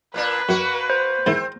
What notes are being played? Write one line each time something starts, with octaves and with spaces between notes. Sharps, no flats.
A#2 A#3 D4 B4
F#2 A#3 F#4
C5
G#2 D#3 C4 E4